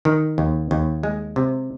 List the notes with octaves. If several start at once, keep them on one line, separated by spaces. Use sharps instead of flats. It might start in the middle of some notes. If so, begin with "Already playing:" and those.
D#3
D#2
D#2
G#3
C3